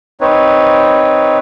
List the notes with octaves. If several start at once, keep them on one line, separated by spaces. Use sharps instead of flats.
C4 D#4 B4 C#5